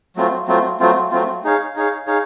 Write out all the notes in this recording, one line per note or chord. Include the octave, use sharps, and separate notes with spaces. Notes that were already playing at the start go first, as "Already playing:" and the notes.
F#3 A3 C4 F4
F#3 A3 C4 F4
F#3 A3 C4 F4
F#3 A3 C4 F4
D#4 G#4 C#5 F5
D#4 G#4 C#5 F5
D#4 G#4 C#5 F5